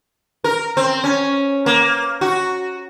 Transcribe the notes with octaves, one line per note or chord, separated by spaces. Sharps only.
A#4
C4
C#4
A#3
F#4